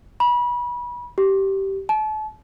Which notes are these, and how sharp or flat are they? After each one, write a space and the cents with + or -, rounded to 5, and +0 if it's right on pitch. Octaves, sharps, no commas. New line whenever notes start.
B5 -30
G4 -15
A5 -35